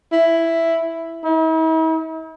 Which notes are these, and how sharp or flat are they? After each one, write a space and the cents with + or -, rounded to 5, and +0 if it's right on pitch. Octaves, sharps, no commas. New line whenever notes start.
E4 +5
E4 -45